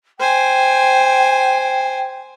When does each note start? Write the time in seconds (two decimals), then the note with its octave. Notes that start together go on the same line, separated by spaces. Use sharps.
0.20 C5 G5 G#5